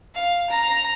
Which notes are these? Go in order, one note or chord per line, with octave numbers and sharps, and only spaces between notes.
F5
A#5